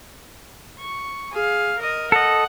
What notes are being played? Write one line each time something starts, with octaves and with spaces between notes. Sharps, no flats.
C#6
G#4 F5
A#4 D#5
A4 D#5 F#5